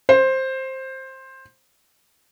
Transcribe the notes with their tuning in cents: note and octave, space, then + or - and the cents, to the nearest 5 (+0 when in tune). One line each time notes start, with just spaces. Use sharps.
C5 +10